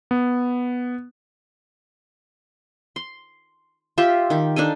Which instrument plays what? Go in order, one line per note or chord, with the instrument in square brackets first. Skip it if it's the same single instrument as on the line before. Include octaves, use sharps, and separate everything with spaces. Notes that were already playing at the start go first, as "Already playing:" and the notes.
[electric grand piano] B3
[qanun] C6
F4 G4 E5
D#3 G4
D4 D#4 A4 G#5